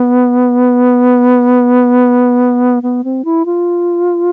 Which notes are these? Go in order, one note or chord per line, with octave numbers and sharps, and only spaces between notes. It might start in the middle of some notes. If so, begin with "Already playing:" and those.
Already playing: B3
B3
C4
E4
F4